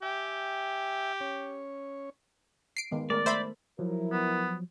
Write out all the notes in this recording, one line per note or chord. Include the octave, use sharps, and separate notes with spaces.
G4 E5 G5 G#5
C#4 C#5
C7 D7
D#3 G#3 B3
G#3 A3 A#4 D5
A3 C5 E5 B5
F3 F#3 E4 A#4
B3